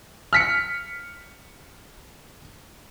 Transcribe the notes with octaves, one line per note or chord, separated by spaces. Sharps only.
F6 B6 C#7